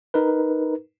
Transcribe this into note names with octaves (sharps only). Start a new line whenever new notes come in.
D#4 A#4 B4